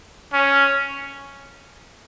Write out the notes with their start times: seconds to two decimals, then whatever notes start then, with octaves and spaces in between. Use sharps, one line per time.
0.33 C#4